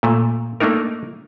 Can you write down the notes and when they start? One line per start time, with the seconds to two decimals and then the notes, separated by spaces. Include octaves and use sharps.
0.03 A#2 A3
0.60 A3 A#3 D4 D#4 A#4